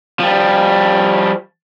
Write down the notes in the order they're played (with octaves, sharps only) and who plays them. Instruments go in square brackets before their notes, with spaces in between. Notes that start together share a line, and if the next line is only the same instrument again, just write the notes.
[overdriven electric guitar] F3 G3